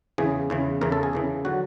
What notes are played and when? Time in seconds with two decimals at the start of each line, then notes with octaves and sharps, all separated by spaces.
0.18 E2 C#3 E3 G#4
0.50 E2 C#3 E3
0.81 E2 C#3 E3 A#4
0.92 A4
1.03 G#4
1.13 E2 C#3 E3
1.45 D3 F#3 F#4